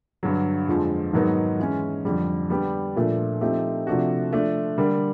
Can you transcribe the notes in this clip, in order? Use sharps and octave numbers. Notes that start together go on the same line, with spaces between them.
G2 D3 F#3
F2 D3 F3 G#3
G#2 D#3 F#3 B3 D#4
E3 G#3 C#4
F2 D3 G3
D3 G3 B3 D4 G4
A#2 F3 A3 D4
F3 A3 C4 D#4 G4
C3 F3 A3 D4 F#4
F3 A3 D4
D3 G3 A#3